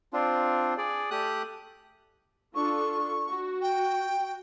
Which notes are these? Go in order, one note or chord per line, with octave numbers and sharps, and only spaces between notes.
C4 D4 F4
G#4 D5
A3 G4 D#6 F#6
D4 F4 A4 C#6
F#4
G5